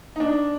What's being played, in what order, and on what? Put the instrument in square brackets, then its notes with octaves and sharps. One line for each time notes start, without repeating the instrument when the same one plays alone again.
[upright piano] D#4
D4